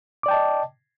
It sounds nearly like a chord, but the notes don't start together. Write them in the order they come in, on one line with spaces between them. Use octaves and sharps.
D6 D5 G5 A5 D#5